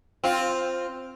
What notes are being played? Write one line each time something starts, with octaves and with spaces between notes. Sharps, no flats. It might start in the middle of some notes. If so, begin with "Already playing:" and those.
C4 F4